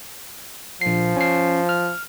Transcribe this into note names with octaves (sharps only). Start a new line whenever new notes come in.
A#1 F3 C7
C#4 C7
F6